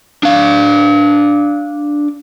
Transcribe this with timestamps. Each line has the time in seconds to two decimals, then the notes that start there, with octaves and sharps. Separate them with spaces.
0.23 D4 F5